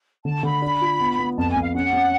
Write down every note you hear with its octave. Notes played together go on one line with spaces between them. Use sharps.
D3 A5
D3 B5
D4
F4
B3
B3
F2 A5
G#5
F2
F5
C#4 F#5
C#4